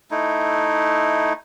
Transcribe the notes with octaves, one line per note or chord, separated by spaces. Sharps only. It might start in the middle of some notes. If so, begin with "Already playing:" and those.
A3 D#4 E4